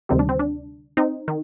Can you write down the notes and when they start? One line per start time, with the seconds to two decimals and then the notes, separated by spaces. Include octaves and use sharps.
0.09 D2 C3 D#3 G3 C4
0.19 D4
0.29 C4
0.39 D4
0.97 C4 D#4
1.28 D#3